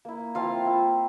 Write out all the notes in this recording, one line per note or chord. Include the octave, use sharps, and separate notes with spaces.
A#3 E4
F3 C4 E4 F4 F5
A#3 E4